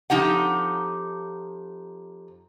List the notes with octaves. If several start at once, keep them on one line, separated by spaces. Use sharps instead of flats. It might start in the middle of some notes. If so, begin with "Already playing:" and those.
F2 F3 D#4 G4 F#5